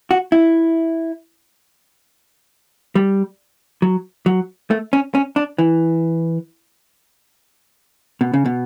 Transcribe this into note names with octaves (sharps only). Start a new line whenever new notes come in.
F#4
E4
G3
F#3
F#3
A3
C#4
C#4
D4
E3
B2
C#3
B2